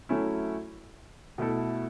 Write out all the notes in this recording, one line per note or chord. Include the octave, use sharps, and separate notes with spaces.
F#3 A3 C#4 E4
B2 A3 E4 A4